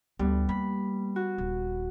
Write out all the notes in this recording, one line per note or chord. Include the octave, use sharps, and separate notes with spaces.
D2 G3 B3
A#3 B5
F#4
D#1